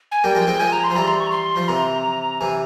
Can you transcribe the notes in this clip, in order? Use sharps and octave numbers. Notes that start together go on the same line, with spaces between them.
G#5
G3 A#3 G5
F3 G#3
G#3 C4
F3 G#3 G#5
A#5
C6
F3
E3 G3 A#5
C6
C#6
A#5
C6
F3
C3 E3 A#5
C3 E3 G#5